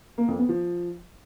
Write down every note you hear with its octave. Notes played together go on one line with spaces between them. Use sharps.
A#3
F2
B3
F3